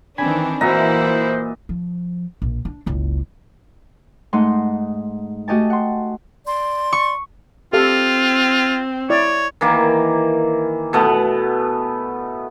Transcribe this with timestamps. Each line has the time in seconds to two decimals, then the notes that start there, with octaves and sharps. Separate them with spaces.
0.18 D#3 E3 C4 D4 G#5 B5
0.61 A#2 E3 E4 F#4 C5 D#5 E5 A#5
1.69 F3
2.42 A#1
2.65 D4
2.86 F#1 C#2
4.33 G#2 A3 D#4 F#5 C6
5.48 A3 F#4 G4 D#5 G#5 A5
5.70 F#5 C6
6.45 D5 C6
6.93 C#6
7.73 C4 F4 G4 A4 F5
9.10 E4 C#5 D5
9.61 D#3 E3 A#3
10.93 B2 A3 B3